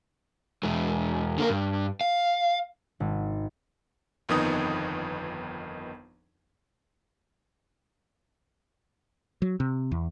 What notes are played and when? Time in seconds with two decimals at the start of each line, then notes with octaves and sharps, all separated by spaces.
0.63 E2 G#3
1.38 D3 A#3 A#4
1.50 G2
2.01 F5
3.00 G#1
4.29 G1 F2 D#3 B3 D#4 D#6
9.42 F#3
9.60 C3
9.92 E2